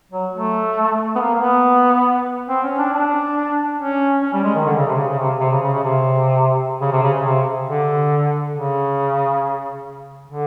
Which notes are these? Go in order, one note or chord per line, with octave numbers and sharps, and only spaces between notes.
F#3
A3
B3
A#3
A#3
B3
C4
C#4
D4
D4
C#4
C#4
G3
G#3
D#3
D3
C#3
C3
C#3
C#3
C3
C3
C#3
C#3
C#3
C3
C#3
C3
C#3
C#3
C3
D3
C#3
D3